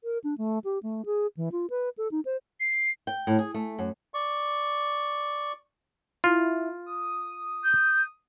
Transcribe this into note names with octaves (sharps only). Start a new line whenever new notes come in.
A#4
D4
A3
G4
A3
G#4
E3
F4
B4
A4
D#4
C5
C7
G5
A2
G#4
A3
F#2
D5 C#6
E4 F4
D#6
G6